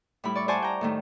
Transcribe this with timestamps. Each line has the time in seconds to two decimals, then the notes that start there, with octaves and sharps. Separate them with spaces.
0.24 A2 G3 E4 B5
0.35 D5 C#6
0.48 C5 D5 F#5 G#5 A5 C#6
0.62 G5 A#5
0.81 A2 D#3 A3